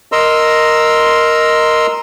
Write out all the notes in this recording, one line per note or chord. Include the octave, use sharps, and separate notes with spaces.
A#4 D#5 A#5 C6 E6